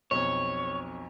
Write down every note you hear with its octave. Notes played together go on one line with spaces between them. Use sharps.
B1 F2 C#5